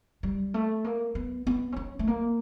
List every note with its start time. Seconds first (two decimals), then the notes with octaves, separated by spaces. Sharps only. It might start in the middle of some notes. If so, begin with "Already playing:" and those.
0.23 G3
0.54 A3
0.84 A#3
1.15 B3
1.47 B3
1.72 C4
1.76 C#4
1.99 A3
2.07 A#3